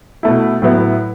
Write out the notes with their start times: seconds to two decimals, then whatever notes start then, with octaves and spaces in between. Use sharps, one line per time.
0.23 B2 A3 E4
0.62 A2 F#3 B3 E4